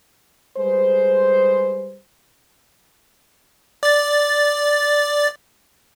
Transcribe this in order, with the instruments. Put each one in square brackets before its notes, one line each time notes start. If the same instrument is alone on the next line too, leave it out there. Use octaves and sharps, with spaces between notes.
[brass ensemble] G3 G#3 G#4 B4 C5
[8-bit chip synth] D5 A6